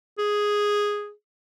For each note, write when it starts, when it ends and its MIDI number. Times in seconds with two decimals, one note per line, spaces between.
0.18 1.12 68